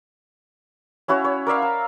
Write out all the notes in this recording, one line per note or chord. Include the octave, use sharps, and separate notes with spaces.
C#4 E4 F#4 C#5
C#5
A#4 D5 E5 F5
A#5